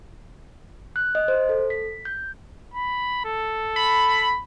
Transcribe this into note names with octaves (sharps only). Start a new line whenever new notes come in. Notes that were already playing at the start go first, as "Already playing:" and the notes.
F#6
D#5
C5
A4
B6
G6
B5
A4
B5